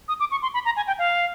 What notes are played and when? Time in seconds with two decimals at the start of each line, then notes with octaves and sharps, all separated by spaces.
0.08 D#6
0.20 D6
0.31 C#6
0.42 C6
0.54 B5
0.65 A#5
0.76 G#5
0.87 G5
0.99 F5